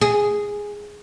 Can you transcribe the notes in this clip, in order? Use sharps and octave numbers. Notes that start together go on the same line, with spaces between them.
G#4